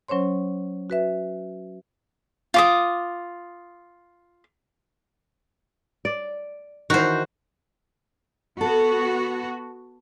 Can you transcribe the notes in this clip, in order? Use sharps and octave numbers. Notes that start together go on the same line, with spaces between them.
F#3 C#4 C5 C#5 C6
F#4 B4 E5
F4 D6 D#6
D5
D#3 E3 F#4 C5
B3 F#4 A4